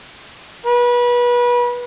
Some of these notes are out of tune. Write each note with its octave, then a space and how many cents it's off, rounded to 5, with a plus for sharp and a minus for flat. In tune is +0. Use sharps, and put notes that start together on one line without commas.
B4 -30